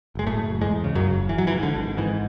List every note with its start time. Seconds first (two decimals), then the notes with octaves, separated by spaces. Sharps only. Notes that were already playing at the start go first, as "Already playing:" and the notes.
0.15 F#1 G#3
0.27 A2 A3
0.38 F#1
0.61 E2 G#2 G#3
0.84 C#3
0.95 F#2 F#3
1.07 F#1
1.29 G#1 E3
1.38 F#3
1.47 E3
1.52 G#2
1.63 D3
1.74 G#1
1.97 G#2 E3